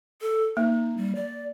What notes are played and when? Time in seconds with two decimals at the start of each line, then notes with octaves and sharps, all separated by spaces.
0.21 A4
0.57 A#3 D#4
0.97 G3
1.15 D5